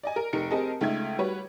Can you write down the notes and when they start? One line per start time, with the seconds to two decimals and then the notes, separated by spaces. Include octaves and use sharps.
0.03 D5 D#5 G#5
0.16 A#4
0.33 F1 D#4 A#4 C#7
0.50 C4 G4 G#4 A#4 D#5 A5
0.81 C#2 A3 D#4 E5 G#6
1.18 G3 F#4 B4 C#5